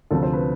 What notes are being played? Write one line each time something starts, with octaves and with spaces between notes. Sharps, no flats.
D2 C3 F3 A4
C5
B4